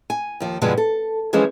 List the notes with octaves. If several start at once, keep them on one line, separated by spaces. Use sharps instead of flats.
G#5
D#2 F3
G2 B2 D3 F3 G3 G#3
A4
E3 F3 G#3 C#4 C5